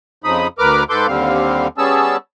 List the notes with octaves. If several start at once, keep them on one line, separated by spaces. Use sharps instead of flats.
F2 C#3 F3 D#4 B5 D#6
D2 A#4 B4 D6 F6
G#2 A4 B4 C6 D6 G6
D#2 D3 G3 C4 F5
G3 B3 C#4 G#4 A5 E6